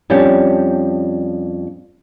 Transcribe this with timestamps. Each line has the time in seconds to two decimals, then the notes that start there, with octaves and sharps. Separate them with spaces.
0.10 F2 G3 C#4 D4 G4 G5